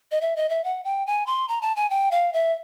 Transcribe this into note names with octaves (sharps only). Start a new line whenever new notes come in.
D#5
E5
D#5
E5
F#5
G5
G#5
C6
A#5
A5
G#5
G5
F5
E5